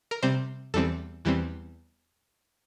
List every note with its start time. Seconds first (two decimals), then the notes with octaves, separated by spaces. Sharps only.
0.11 A#4
0.22 C3 G3 C4 C5
0.74 E2 E3 G3 C4 A4
1.25 E2 E3 G3 C4